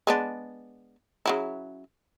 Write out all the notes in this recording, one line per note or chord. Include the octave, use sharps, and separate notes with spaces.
G#3 B3 D4
C#3 F#3 E4